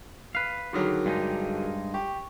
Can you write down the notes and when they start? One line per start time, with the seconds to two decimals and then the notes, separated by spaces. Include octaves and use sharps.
0.35 B4 F5
0.73 D3 D#3 F#3 F#4 G#4 A#4
1.06 G2 G#3 D#4
1.94 G4 C#6